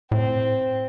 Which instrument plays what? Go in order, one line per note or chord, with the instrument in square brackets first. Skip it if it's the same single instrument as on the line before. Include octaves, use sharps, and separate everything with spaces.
[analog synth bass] A2 [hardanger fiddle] C4